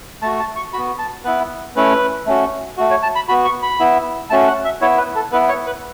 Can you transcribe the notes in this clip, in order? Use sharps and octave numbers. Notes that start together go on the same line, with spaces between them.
A3 F#4 A5
A5
C#6
B3 F#4 B5
A5
B3 E4 B4
A3 C#4 E4 B4
A3 C#4 F#4
A3 F#4
C#5
A5
B5
B3 F#4 B5
C#6
B5
B3 E4
A3 C#4 F#4 A5
F#5
E5
B3 E4 C#5
B4
A4
B3 E4 B4
C#5
B4